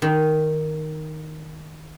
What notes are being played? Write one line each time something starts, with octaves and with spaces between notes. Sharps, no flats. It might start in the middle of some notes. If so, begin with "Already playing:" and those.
D#3